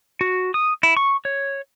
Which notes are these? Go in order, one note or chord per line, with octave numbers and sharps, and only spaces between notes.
F#4
D#6
E4
C#6
C#5